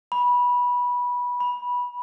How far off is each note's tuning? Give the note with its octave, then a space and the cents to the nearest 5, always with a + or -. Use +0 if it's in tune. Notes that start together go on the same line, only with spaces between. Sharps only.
B5 -15
B5 -10